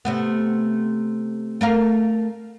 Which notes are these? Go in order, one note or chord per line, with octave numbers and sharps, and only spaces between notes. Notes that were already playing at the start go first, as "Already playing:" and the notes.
C3 A3 B3
A3 A#4 F5